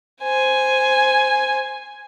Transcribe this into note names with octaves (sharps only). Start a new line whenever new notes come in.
C5 G#5